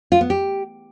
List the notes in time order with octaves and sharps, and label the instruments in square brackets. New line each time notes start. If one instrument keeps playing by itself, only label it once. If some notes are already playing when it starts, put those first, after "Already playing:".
[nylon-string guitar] F4
B3
G4